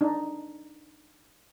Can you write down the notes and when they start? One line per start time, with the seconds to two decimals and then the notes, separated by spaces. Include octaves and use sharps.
0.01 D4 D#4